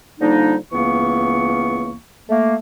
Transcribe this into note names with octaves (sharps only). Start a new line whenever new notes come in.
D3 F3 G3 A#3 D4 D#4
C#2 E3 A#3 B3 C#6
A3 A#3